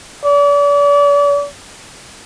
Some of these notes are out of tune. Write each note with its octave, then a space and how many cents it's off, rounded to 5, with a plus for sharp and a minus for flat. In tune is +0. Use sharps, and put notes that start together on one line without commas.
D5 -40